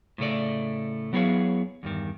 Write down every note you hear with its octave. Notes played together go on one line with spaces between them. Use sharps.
A2 C#3 A3 D5
F#3 B3 E4 G#4 C#5 F5
E2 G2 D#3